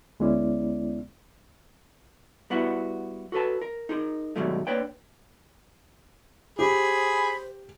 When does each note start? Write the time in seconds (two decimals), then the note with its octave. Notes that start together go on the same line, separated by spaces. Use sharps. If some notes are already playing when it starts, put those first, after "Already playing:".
0.20 D2 G#3 B3 C#4 E4 D5
2.50 G3 B3 E4 F#4
3.32 F#4 A4 B4 A5
3.62 A#4
3.89 D#4 G#4 A#4
4.36 G#2 B2 D#3 F#3 G3 A3
4.67 A#3 D4 B4 C#5 G5
6.59 G4 G#4 C5 B5